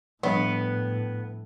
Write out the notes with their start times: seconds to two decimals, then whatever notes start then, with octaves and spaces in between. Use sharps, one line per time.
0.23 A2 F3 G3 B3 D4